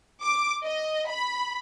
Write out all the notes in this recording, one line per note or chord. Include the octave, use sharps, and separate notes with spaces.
D6
D#5
B5